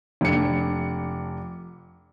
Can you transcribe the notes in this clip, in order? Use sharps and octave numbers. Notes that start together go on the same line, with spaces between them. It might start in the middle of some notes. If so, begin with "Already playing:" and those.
F1 D4 C#7